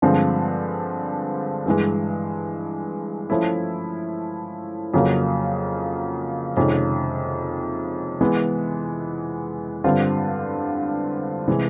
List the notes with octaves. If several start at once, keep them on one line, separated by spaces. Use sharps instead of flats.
G2 D3 F3 G#3 C4
G2 E3 G#3
F3 A3 C#4 E4
F2 C#3 F#3 A#3
F2 C3 D#3 G#3 C#4
E3 G#3 B3
G2 D3 G3 C4 F4
C3 E3 G#3